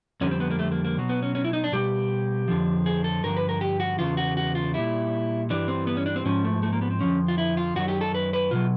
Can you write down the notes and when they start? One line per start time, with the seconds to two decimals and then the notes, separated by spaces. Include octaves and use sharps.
0.21 F2 D3 G3 C#4
0.31 C4
0.40 B3
0.51 A#3
0.59 A3
0.72 A#3
0.85 A#3
0.98 B2 F#3
1.09 B3
1.23 C#4
1.35 C#4
1.44 E4
1.53 D#4
1.64 D4
1.72 B2 G3 G4
2.48 F2 D3 F3
2.86 G#4
3.04 A4
3.24 G2 D3 F3 A#4
3.37 B4
3.49 A#4
3.61 G4
3.80 F#4
3.99 E2 C#3 F4
4.17 F#4
4.37 F#4
4.55 F4
4.74 A#2 G3 E4
5.50 G2 E3 G3 D4
5.68 C4
5.87 B3
5.97 C#4
6.06 D4
6.16 C4
6.25 G#2 F3 C#4
6.45 A3
6.63 A3
6.73 A#3
6.82 B3
6.91 C4
7.01 F2 D3 F3 C#4
7.28 F4
7.38 E4
7.57 F4
7.76 F#2 D#3 F#3 F#4
7.88 G4
8.01 A4
8.15 B4
8.33 B4
8.51 B2 F#3 F4